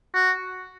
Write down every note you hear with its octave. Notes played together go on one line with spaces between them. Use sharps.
F#4